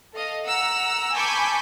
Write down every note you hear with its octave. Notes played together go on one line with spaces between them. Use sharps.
A4 D#5 F5
F#5 A#5 E6
G#5 A5 B5 C#6 D6 G6